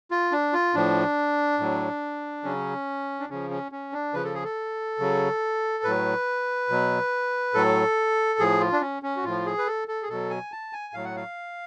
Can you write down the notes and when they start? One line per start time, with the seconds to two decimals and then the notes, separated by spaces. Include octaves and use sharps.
0.11 F4
0.32 D4
0.53 F4
0.74 A2 F3 D4
1.59 A2 F#3
2.44 C#3 F#3 C#4
3.20 D4
3.29 C#3 F3 C#4
3.51 C#4
3.72 C#4
3.93 D4
4.14 C#3 F3 B4
4.24 A4
4.34 G#4
4.44 A4
4.99 C#3 F#3
5.84 A2 F#3 B4
6.69 B2 F#3
7.54 A2 F#3 A4
8.39 A2 F3 G#4
8.60 F4
8.72 D4
8.81 C#4
9.03 C#4
9.17 F#4
9.24 A2 F3 F4
9.46 G#4
9.58 B4
9.67 A4
9.88 A4
10.03 G#4
10.09 B2 F#3 A4
10.30 G#5
10.52 A5
10.73 G#5
10.94 A2 F#3 F5
11.05 F#5
11.16 F5